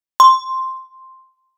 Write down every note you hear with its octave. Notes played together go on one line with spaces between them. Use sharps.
C6